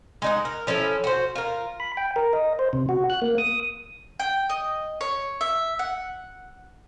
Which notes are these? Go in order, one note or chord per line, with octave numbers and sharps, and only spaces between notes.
G#3 D#4 F#5
A#4
F3 C#4 E4 A4
F#4 C5
F4 A#4
B5
G5
A#4
D#5
C5
C3
F#4
F#6
A#3
D#6
G5
D#5
C#5
E5
F#5